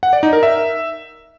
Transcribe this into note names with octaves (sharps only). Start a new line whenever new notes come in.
F#5
D5
D#4
A#4
E5